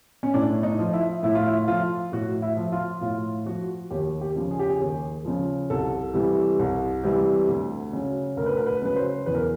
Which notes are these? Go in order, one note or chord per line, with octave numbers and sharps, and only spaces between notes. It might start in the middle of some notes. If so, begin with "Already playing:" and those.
C#4
A2 D4
D#4
F3
E4
A2 E4
F4
E4
F3 F4
A2 F#4
E4
F3
F4
A2 F4
F3 F#4
D#2 G4
G4
C#3 F3
G#4
G4
G#4
D#2
C#3 F3
C2 A4
C3 E3 G3
C2
C3 E3 G3
D2
C#3 F#3
D2 A#4
B4
A#4
B4
C#3 F#3 B4
C5
E2 B4
A#4